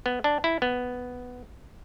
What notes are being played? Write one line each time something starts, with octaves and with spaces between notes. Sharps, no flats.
B3
D4
E4
B3